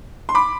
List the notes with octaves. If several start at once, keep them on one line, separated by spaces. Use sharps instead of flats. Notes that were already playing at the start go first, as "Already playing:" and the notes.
C6
B5 D6